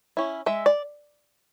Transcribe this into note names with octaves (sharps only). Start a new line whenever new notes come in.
C#4 E4
G#3 E5
D5